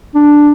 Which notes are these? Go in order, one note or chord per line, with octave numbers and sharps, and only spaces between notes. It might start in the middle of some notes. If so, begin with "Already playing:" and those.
D4